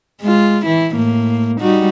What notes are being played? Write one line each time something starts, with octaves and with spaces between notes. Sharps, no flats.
G#3 F4
E3 E4
A2 A#3
G3 D#4 F#4